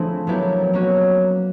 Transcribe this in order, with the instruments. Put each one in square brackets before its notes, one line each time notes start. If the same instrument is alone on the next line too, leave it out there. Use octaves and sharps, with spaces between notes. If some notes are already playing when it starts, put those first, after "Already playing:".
Already playing: [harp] F3 A3 C4 D4 E4 G#4
F#3 B3 E4 G4 A#4
A#3 C#4 F#4